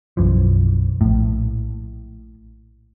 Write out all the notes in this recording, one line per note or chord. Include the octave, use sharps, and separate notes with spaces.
B1 F#2 E3 F3
A#1 A2